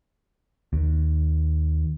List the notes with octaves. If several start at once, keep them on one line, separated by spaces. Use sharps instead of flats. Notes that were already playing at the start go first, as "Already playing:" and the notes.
D#2